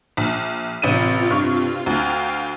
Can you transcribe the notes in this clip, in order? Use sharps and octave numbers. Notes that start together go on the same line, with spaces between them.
A#1
A1 C3 F4 D#7
G2 C#6
D2 F5 G5